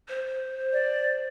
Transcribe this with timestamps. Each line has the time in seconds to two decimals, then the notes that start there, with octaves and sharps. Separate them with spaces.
0.08 C5
0.73 D5